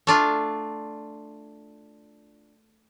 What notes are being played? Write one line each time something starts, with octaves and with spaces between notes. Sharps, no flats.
A3 D4 F4